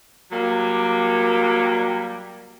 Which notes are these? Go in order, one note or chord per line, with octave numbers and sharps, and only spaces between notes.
F#3 G3 A#3